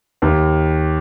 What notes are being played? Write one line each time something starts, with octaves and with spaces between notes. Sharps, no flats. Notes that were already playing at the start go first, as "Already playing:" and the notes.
D#2